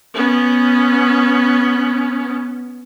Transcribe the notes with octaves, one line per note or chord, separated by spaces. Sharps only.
B3 C#4